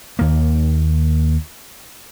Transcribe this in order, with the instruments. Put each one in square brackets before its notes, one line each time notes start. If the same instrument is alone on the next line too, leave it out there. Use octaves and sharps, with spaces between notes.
[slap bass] D#2 A#3